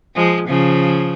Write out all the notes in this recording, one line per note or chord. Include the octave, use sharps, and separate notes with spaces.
F3 G#3
C#3 F3